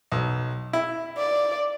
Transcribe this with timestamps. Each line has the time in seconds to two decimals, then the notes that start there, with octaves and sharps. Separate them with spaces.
0.12 B1
0.73 E4
1.18 D5